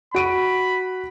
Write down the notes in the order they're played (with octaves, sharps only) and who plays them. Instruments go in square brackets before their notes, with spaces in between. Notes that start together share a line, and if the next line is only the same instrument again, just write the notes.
[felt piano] F#4 D7 D#7 [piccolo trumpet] B5